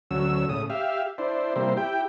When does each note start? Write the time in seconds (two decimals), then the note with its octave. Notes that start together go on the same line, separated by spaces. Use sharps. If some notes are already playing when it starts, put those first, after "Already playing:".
0.11 D2 F#3 C#4 E6
0.49 A2 C#3 D#6
0.70 G4 E5 F5
1.18 D4 E4 C5
1.56 C3 G3 A#3 E4 C5
1.77 E4 G4 G5